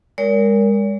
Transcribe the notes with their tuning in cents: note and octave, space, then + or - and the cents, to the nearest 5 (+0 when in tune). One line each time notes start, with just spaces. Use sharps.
G#3 -30 A#4 +0 C#5 +45